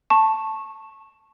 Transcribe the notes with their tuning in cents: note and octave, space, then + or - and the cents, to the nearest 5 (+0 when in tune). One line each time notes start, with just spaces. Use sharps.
A5 +0 C#6 -20